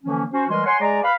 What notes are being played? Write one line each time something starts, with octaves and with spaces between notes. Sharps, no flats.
D3 E3 F3 A#3 C#4
C#4 F#4 C5
E3 G3 G#3 A#4 G#5 C6
C#5 F#5 G#5 C6
G#3 G#4 D5 G#5 A#5
B4 F5 B5